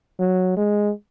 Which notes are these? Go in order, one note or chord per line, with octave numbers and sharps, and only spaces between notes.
F#3
G#3